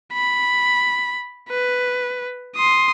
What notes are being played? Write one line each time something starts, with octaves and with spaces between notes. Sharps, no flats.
B5
B4
C6 D#6